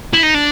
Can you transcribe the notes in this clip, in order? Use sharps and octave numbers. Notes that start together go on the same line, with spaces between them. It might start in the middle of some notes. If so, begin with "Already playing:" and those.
E4
D#4
D4